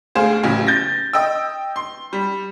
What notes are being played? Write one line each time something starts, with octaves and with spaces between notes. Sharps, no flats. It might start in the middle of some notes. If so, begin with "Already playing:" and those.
D2 G#4 C5 F5 E7
A1 C#3 E3 F#3
G6 A6 A#6
D#5 G5 E6
C6
G3